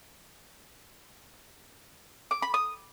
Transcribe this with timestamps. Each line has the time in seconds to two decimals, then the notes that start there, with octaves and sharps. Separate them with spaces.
2.31 D6
2.42 B5
2.54 D#6